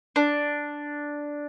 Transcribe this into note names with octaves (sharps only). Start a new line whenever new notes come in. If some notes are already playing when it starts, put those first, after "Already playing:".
D4